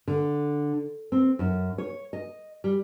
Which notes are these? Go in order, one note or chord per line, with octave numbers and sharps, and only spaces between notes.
D3
C4
F#2
C#5
D#5
G3